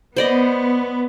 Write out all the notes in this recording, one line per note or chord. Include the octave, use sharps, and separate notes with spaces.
B3 C5 D5 D#5